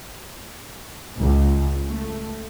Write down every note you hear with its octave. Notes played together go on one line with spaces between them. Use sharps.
C#2
A3